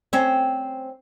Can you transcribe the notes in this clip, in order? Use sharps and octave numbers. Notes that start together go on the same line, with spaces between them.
C4 C#4